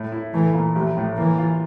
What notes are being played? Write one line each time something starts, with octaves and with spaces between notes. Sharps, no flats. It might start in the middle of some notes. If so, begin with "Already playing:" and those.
Already playing: A2
E4
E3 A3
A#2
A1 F3
A2
E3 A#3
F4